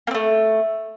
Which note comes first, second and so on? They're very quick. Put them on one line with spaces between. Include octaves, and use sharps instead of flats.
A#3 C4 A3